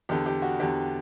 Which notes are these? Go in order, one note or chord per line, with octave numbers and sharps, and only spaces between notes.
E2 D3 G4
G4
F#4
E2 D3 G4